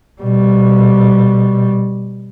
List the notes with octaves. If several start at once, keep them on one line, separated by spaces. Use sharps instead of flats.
B2 G3